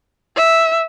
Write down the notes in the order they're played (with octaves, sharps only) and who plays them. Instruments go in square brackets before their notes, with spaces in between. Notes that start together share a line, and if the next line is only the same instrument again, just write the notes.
[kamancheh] E5